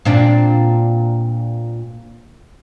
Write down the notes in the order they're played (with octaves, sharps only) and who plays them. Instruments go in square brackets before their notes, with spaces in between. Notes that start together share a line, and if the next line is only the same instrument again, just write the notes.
[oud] A#2 C4 D4